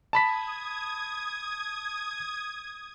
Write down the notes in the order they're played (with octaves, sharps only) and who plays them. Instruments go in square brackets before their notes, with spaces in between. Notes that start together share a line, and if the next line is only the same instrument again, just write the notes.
[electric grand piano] A5 B5 B6 [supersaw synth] D#6 G#6